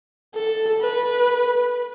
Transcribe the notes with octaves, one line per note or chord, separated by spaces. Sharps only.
A4
B4